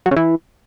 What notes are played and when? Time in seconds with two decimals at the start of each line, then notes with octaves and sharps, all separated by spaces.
0.06 F#3
0.11 C#3
0.16 E3